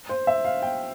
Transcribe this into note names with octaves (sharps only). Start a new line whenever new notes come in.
C5
E5
F5
G5